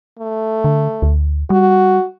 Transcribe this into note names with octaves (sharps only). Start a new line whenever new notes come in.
A3
D3
D2
G3 F#4